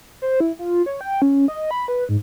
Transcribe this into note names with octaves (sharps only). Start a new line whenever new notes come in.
C5
E4
F4
C#5
G5
C#4
D#5
B5
B4
G#2